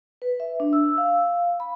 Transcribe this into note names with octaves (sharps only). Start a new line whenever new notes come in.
B4
E5
D4
E6
F5
B5